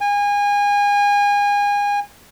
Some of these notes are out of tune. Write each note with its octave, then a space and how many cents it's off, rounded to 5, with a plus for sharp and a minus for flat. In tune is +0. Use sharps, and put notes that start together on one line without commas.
G#5 -30